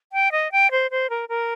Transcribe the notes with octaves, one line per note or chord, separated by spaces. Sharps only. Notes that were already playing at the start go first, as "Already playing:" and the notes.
G5
D#5
G5
C5
C5
A#4
A#4